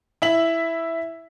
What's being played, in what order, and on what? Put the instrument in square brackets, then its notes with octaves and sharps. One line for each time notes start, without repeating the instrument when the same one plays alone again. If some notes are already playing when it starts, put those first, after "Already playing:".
[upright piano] E4 E5 F#7